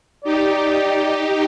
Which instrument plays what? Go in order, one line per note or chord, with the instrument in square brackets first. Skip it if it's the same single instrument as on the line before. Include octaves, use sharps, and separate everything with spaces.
[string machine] D#4 G4 [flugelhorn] D5